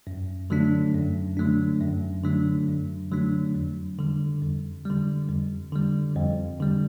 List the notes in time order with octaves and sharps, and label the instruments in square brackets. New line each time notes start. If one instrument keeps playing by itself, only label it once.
[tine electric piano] F#2
D3 F#3 A3 D4
F#2
D3 F#3 A3 D4
F#2
D3 F#3 A3 D4
F#2
D3 F#3 A3 D4
F2
D3 G3
F2
D3 G3
F2
D3 G3
F2
D3 G3